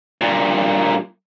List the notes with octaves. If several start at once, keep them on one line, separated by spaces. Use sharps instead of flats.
G2 A#2